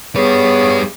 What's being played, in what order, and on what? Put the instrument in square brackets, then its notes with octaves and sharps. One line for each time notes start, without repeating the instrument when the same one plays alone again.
[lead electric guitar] G3 B4 [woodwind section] B3 G#4 [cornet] C#5